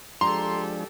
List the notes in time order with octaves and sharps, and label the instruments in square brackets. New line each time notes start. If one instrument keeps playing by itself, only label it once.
[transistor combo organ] F3 G#3 D4 [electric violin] G4 A4 [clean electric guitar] A#5 [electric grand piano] C6